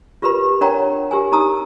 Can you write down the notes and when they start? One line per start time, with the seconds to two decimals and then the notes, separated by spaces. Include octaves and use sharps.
0.22 F4 G4 A#4 B4 B5
0.61 D4 A#4 C#5 F#5 G5 A#5
1.11 G4 A#4 G#5
1.32 D#4 A5 A#5 D#6 E6